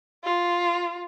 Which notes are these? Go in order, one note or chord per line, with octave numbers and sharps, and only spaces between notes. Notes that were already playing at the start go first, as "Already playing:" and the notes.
F4